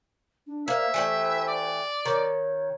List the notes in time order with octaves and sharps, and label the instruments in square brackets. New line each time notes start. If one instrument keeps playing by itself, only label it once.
[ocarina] D4
[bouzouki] A#3 F5 [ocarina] C5 [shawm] E5
[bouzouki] E3 A3 G4
[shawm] D5
[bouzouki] D#3 [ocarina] C#5